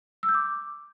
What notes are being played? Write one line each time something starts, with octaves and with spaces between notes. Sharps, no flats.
E6
G6
D6